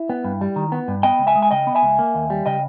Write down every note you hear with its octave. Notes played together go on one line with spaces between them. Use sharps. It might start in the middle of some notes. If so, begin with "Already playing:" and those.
Already playing: E4
B3
G2
G3
D#3
B3
G2
B3 D#5 G5
C#2
E5 G#5
G#3
G#5
C#3 D#5 G5
B3
E5 G#5
C#2
A#3
D#2
G3
C#3 D#5 G5